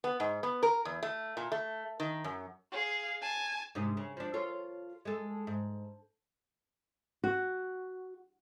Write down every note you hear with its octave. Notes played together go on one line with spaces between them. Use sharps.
B3
G#2
B3
A#4
E2
A3
A#2
A3
D#3
F#2
G#4 F5
G#5 A5
G#2 C3 D#4
C#3
F3 D4
F4 A4 C#5
G#3 A4
G#2
F#4